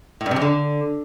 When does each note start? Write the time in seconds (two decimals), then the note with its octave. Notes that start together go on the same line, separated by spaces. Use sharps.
0.21 A2
0.26 G2
0.31 C3
0.36 F2
0.41 D3